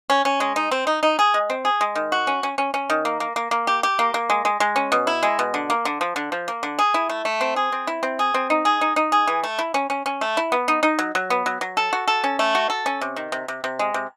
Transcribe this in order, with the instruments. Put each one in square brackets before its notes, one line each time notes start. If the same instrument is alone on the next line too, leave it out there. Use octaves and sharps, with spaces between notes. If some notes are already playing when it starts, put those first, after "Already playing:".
[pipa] C#4
C#4
G#3
D#4
C4
D#4
D#4
G#4
G#3
C4
G#4
G#3
D#3
F#4
C#4
C#4
C#4
C#4
D#3
A#3
A#3
A#3
A#3
G4
G4
A#3
A#3
G#3
G#3
G#3
C#4
B2
E4
G#3
B2
D3
A#3
D3
F3
D3
F3
A#3
D3
G#4
E4
A3
A3
C4
G#4
C4
E4
C4
G#4
C4
D#4
G#4
D#4
D#4
G#4
E3
A3
E4
C#4
C#4
C#4
A3
E4
B3
D#4
D#4
F#3
F#3
B3
F#3
F#3
A4
F#4
A4
C#4
A3
F#4
A4
C#4
C3
D#3
C3
C3
C3
G#3
C3